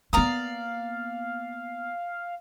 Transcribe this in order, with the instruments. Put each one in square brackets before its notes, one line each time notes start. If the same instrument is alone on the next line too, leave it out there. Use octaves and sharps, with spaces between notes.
[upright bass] A#3 B3 [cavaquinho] D5 A#5 D#6 [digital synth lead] F5